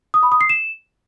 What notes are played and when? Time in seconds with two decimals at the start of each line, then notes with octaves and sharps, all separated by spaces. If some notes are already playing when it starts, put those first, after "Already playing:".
0.14 D#6
0.23 B5
0.32 D#6
0.41 C7
0.49 E7